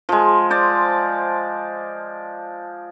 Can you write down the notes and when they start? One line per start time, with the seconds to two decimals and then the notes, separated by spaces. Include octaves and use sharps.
0.09 F3 G#3
0.50 C5 D5